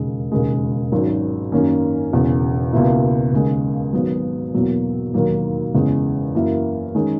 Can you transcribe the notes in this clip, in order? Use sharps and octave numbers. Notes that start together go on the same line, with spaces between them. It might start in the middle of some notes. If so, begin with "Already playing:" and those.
Already playing: E1 D#2 C#3 G#3
E1 D#2 C#3 G#3
G#1 G#2 D#3 F#3 C#4
F#2 D#3 A#3 C#4
E1 E2 C#3
C#2 B2 A#3 E4
D#2 C#3 G#3
G#1 G#2 F#3 B3
E2 B2 F#3 A#3
E1 D#2 D#3 F#3 A#3
F#1 E2 C#3 G#3 C#4
F#2 E3 A#3 E4
D#3 G#3 C#4